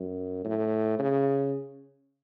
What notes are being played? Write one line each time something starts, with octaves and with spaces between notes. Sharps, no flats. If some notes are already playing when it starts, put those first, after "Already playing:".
Already playing: F#2
A2
C#3